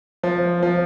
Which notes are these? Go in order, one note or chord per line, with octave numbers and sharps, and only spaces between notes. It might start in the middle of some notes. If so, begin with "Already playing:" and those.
F3
F3